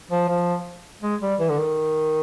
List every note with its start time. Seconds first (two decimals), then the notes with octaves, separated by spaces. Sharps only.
0.11 F3
0.29 F3
1.02 G#3
1.21 G3
1.40 E3
1.49 D3
1.58 D#3